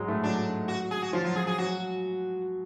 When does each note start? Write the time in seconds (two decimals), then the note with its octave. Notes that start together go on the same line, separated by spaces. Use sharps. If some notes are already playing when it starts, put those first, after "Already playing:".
Already playing: G#2 F#3 G#3
0.08 A2 A3
0.24 F#3 D4
0.68 F#4
0.91 G#4
1.02 F#4
1.13 F3 F4
1.24 F#3 F4
1.36 F#3 G#4
1.47 G#4
1.58 F#3 F#4